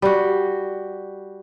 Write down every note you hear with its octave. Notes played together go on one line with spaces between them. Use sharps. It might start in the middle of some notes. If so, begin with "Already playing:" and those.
G3 F#4